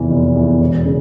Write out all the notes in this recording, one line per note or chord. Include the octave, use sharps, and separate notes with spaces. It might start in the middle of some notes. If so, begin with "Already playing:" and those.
Already playing: F1 E2 E3
F1
E2 E3
E1
C#3